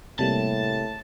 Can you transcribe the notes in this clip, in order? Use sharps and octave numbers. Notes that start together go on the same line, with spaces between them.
A2 C3 G3 A#3 A5